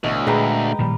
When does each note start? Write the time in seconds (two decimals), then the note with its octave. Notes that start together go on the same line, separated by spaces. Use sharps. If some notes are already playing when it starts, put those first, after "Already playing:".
0.04 A1 D2 B2 C#5 D#5
0.27 A#2 G#3 B4 G5 A#5
0.79 A1 A#2 D#3 F3 G3